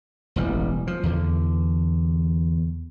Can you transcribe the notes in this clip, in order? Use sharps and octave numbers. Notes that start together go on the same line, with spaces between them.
E1 A1 G3
F3
E2 D3